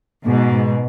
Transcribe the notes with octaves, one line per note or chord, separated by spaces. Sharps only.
G#2 B2